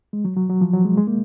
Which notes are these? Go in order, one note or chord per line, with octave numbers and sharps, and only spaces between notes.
G#3
F#3
F#3
F#3
F3
F#3
G#3
G#3
A#3